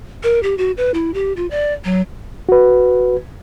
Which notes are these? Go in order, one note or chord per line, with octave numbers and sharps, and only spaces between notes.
A#4
G4
F#4
B4
E4
G4
F4
D5
F#3
F#4 B4